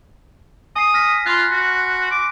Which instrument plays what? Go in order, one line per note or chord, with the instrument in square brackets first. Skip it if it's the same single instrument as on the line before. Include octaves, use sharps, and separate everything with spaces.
[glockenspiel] G#5 C7 [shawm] D#6
[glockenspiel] F6 A#6 B6
[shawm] F4 [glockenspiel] B5 C6 F#6
[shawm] F#4
D6